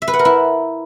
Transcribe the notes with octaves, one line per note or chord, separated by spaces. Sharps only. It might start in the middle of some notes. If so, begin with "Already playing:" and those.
E5
B4
F#5
A#4
E4